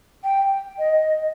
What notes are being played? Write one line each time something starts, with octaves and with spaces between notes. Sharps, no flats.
G5
D#5